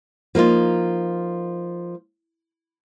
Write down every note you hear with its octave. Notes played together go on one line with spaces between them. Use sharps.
F3 A#3 D#4 F4